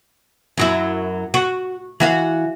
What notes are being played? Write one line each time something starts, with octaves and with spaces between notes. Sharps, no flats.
F#2 F#3 E4
F#4
E3 F#4 F5